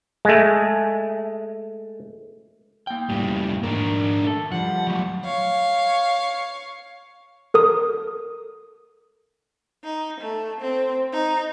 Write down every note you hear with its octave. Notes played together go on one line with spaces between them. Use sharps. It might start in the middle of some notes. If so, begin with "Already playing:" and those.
G#3 A3
A#3 G5
A2 G3
G#2 D#3 D4 A#4
A3 A4
F3 G3 F#5
F#3 A3
C#5 F5
A4 A#4 D#6
D#4
A3
C4
D#4